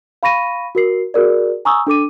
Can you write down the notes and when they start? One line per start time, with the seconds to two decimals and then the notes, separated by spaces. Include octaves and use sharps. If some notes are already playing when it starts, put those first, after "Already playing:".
0.23 F5 B5 C#6 A#6 D#7
0.75 F#4 A#4 C7
1.14 F#4 G#4 A#4 D5
1.65 G#5 A#5 C#6 D#6 E6
1.87 D4 A4 D6 D#7